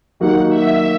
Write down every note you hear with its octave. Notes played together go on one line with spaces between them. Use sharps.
D#3 F#3 A#3 D#4 F#4 F#5
E5